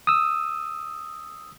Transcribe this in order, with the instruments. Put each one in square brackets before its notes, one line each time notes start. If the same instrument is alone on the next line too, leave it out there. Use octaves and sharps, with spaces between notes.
[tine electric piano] D#6 E6